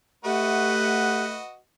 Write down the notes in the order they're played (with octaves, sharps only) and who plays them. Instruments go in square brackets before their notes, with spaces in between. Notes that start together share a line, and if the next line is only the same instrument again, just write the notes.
[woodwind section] A3 F#5 [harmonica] F#4 B4 D#5 [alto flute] G4